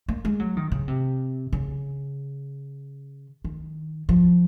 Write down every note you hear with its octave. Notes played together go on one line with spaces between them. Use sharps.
A#3
G#3
F#3
D#3
C#3
C3
C#3
D#3
F3